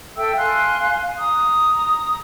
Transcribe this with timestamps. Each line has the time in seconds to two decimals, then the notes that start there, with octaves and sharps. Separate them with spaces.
0.16 A4 E5 G5 E6
0.37 F5 G#5 C6 F#6
1.18 A#5 D#6